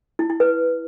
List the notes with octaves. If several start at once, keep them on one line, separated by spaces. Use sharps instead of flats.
E4
E4
B4